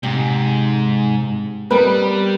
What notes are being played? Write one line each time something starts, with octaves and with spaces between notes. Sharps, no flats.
G#2 C3
G3 B3 C4 A#4 B4